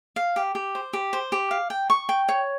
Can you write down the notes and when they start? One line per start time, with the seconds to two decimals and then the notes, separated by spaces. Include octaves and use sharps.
0.16 F5
0.36 G4
0.55 G4
0.75 C5
0.93 G4
1.13 C5
1.32 G4
1.51 F5
1.70 G5
1.90 C#6
2.09 G5
2.29 C#5